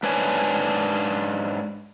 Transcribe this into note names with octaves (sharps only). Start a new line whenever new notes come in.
G#2 D4 B4 C#5 G#5